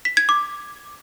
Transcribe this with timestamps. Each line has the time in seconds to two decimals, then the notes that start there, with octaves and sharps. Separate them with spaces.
0.05 B6
0.17 G#6
0.29 D6